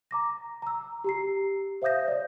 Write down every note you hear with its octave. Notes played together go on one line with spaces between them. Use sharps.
A#5 D6 A#6
A#5 E6
G4 A#5 C7
C5 E5 F5 D#6 G6 A#6
C#5 D5